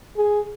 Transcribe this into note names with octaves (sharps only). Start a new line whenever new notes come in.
G#4